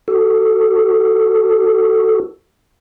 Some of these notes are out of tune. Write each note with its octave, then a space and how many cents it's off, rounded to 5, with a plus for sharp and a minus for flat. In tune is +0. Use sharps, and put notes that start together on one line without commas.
F#4 +20 A4 +5